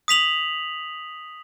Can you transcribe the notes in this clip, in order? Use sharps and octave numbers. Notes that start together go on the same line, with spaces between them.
D#6 B6 F7 F#7